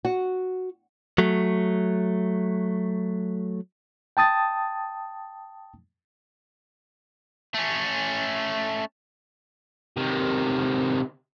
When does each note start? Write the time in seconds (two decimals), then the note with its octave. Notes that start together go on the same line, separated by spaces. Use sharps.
0.05 F#4
1.18 F#3 A3
4.17 G5 A5 D#6 A6
7.54 A3 C#4
9.97 C3 D#3